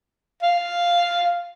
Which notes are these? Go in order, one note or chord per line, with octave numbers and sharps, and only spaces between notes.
F5